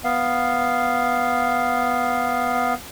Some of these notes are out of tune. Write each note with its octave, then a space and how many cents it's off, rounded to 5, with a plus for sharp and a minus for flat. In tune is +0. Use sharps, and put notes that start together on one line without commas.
B3 +0 F5 +0